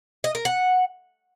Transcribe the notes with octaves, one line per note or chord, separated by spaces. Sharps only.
D#5
A#4
F#5